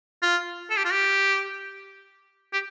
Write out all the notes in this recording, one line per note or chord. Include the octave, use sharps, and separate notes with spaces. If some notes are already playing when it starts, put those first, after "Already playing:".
F4
A4
G4
F4
G4
G4